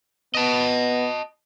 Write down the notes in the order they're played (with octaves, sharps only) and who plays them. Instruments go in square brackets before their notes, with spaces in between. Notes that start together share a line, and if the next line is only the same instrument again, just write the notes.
[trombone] B3 [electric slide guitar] D#5 A5